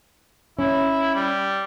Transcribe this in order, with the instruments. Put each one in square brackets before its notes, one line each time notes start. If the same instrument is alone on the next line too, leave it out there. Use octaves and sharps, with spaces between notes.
[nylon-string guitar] C#4 [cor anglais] E4
[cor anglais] G3